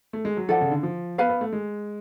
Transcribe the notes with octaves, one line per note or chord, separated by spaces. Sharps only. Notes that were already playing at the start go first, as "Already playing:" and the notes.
A3
G#3
F#3
F3 A4 D5 F#5
C#3
D3
F3
B3 B4 F5 B5
B3
A3
G#3